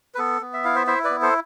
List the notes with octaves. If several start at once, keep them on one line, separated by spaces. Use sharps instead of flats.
B4
B3 A4
B3
E5
E4 F5
C5 E5
E4 C5 E5
B4 D5
B3
A4 C5